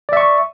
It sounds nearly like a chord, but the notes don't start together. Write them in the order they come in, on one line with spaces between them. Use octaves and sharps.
D5 E5 C#6